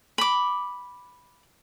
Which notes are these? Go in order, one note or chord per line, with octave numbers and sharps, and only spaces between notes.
B5 D6